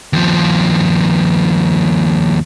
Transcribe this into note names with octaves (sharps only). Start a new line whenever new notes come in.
D#2 F3